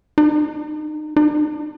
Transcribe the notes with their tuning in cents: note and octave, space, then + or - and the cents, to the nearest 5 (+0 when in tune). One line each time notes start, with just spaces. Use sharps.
D#4 -30
D#4 -35